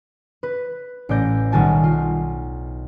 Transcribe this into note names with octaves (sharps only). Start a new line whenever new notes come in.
B4
A1 D5 G6 A#6
B1 D#3 G3 F#4 G#5 A5
F4